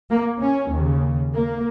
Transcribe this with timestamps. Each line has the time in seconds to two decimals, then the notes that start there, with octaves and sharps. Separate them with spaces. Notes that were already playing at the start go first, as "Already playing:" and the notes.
0.10 A#3
0.40 C#4
0.71 D#2 C#3
1.32 A#3